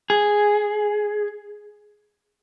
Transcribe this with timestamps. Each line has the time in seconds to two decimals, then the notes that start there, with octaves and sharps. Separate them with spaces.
0.10 G#4